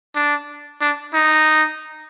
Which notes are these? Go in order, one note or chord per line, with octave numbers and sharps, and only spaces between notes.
D4
D4
D#4